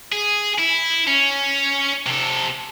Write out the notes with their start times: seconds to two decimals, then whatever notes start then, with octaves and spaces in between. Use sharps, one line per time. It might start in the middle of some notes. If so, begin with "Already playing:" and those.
0.12 G#4
0.59 E4
1.07 C#4
2.06 C3 A4